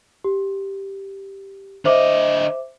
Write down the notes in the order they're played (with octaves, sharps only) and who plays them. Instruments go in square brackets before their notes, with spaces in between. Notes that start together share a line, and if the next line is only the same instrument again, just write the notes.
[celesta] G4
[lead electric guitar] D3 D#5 [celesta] C5 E5 D6